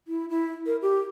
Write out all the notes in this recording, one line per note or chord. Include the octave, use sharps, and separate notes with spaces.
E4
E4
A#4
G4